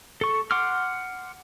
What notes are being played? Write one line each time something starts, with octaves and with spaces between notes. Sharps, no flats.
A4 C#6
F#5 C6 D6 F6